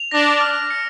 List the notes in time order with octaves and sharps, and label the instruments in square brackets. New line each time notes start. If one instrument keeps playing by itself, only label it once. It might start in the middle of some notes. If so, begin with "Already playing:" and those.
Already playing: [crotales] F7
[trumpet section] D4 [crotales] A#6
[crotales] F6
C#7